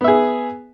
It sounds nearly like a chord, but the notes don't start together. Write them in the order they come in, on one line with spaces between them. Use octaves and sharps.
B3 E5 G#4